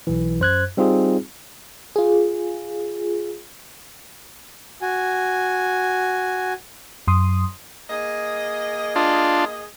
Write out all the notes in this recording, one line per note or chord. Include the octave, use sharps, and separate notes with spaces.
B1 E3
F#2 C5 F#6 G#6
G3 C4 D#4 F4 G#4
F4 G#4
F#4 G#5
F#2 C6 D#6
A#3 G#4 D#5
D4 F4